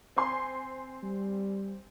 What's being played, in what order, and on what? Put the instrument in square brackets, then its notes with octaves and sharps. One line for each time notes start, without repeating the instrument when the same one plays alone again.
[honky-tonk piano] C4 G#5 C6
[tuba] G3